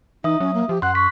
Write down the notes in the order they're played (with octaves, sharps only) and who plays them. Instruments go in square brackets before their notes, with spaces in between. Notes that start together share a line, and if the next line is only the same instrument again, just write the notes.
[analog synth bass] E3 [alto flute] D#4 [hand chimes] E5 D#6
[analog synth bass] F#3 [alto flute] C#4
[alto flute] A#3
[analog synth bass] F3 [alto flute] G4
[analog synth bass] F#2 [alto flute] F#5 [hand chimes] C6 F#6
[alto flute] C#6 [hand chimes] B6